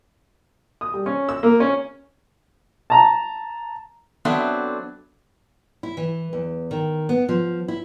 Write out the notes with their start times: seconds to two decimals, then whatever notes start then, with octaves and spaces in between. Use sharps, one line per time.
0.81 D#6
0.94 G3
1.06 C#4
1.29 E6
1.43 A#3
1.60 C#4
2.90 A5 A#5
4.25 F#3 B3 C4 D4 A4 E5
5.83 E4
5.97 E3
6.33 E2
6.71 D#3
7.09 B3
7.29 F3
7.68 E4